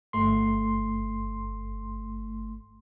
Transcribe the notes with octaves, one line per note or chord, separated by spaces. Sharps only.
G1 A3 C6